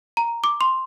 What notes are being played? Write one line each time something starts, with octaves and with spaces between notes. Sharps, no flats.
A#5
D6
C6